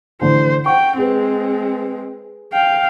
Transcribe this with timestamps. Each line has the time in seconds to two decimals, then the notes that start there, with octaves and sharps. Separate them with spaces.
0.22 A1 D3 C5
0.66 F#5 G5 C#6
0.98 G#3 C4 G#4 B4
2.53 F5 G5